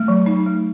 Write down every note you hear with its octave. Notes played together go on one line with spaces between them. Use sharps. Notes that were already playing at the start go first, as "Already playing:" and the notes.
Already playing: A3
F#3
D#4
A3